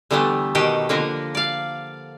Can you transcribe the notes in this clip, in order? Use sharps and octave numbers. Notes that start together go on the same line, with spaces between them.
D3 E3 G3 A3 B3
B2 D#3 G4 B4 F#5
D3 F3 A#3 A#4 B4
D5 F5